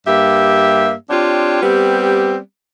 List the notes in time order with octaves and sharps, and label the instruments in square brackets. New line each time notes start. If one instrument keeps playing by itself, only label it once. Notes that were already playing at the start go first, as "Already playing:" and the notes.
[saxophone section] G2 A#3 G4 E5
C4 D4 F4 G4 C#5
G3 B3 C4 G4